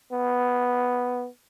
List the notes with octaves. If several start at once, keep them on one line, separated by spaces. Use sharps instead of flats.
B3